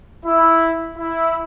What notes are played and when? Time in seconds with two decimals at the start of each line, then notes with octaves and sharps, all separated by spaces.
0.25 E4
0.98 E4